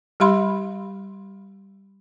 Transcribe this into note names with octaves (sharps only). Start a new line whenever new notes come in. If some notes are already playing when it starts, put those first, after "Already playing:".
G3 G4 F5 B5 C6